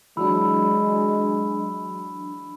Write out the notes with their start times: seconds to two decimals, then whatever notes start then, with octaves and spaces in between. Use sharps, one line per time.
0.17 E3 F#3 G#3 D4 B5 E6